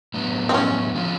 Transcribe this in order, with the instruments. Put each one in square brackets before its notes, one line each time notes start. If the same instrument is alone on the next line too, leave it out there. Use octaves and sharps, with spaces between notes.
[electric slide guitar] A2 F#3 B3 D4
[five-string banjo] C4
C#4
[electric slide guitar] D3 F3 G#3 C#4 F4